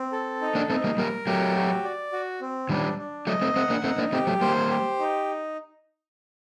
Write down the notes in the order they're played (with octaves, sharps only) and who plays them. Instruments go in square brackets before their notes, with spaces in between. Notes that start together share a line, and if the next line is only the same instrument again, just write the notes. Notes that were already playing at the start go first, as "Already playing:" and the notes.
Already playing: [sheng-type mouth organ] C4
A4
D#4
[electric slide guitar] A#3 D4
[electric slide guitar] A3 C4 [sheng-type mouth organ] D#4
[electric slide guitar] G3 A#3
[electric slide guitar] G3 A#3 [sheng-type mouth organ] A#4
[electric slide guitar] F#3 A3 [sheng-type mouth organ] G4
[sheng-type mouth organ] F#4
D5
F#4
C4
[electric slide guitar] D#3 G3 [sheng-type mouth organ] D4
[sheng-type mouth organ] D4
[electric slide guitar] F#3 A3 [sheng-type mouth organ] D#5
[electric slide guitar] A3 C4
[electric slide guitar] A3 C4 [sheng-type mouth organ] F#5
[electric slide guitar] A#3 D4
[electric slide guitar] A3 C4 [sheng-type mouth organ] D#4
[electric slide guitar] A#3 D4
[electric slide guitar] A3 C4 [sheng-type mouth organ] G4
[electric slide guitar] F#3 A3
[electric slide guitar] G3 A#3 [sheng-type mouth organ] C5
[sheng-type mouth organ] G4
D#4